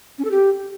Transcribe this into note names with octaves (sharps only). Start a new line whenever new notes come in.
C#4
A4
G4